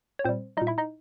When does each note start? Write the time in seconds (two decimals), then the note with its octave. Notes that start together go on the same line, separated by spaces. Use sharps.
0.19 C#5
0.24 A#2 G3 C4 C5
0.57 G3 D#4 D#5
0.62 A#2
0.67 E4 E5
0.78 D#4 D#5